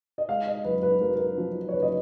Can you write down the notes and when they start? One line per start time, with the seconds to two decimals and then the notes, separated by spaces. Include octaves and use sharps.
0.18 D#5
0.29 G#3 F5
0.47 D#5
0.65 F#1 B4
0.83 B4
1.02 F#2 A#4
1.15 A#4
1.38 F3
1.69 C#5
1.74 F#1 B4
1.82 D#5